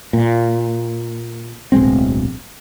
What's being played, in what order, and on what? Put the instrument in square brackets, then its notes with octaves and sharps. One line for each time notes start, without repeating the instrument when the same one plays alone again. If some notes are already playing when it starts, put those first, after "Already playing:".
[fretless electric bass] A#2
D1 B1 G#3 C4